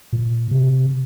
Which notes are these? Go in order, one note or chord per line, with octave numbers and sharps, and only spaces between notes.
A#2
C3